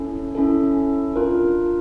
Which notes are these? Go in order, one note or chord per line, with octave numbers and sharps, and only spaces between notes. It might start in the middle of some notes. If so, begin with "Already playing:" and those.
Already playing: C#4 E4 A4
C#4 E4 A4
D4 F4 A#4